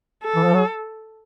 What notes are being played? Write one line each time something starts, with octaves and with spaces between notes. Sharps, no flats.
A4
E3
F3
F#3